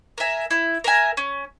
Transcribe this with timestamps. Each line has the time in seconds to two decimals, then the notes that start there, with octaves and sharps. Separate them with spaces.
0.18 A#4 E5 G#5
0.51 E4
0.84 A#4 E5 G#5
1.17 C#4